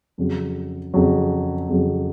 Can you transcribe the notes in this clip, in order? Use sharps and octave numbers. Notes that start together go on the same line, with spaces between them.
F2 C#3 F#3
F2 C#3 F#3
F2 C#3 F#3